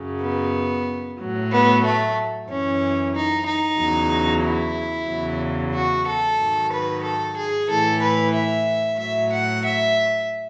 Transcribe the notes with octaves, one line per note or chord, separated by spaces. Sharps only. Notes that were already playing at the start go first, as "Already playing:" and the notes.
Already playing: F#2 C#3 F#3
B3
A2 F#3
B3
A3
F#2 E3 C#4
D#4
D#4
E2 C#3 F#3
E4
E2 C#3 F#3
F#4
A4
G#2 D#3 F#3
B4
A4
G#4
A2 E3 A4
B4
E5
A2 F#3 E5
F#5
E5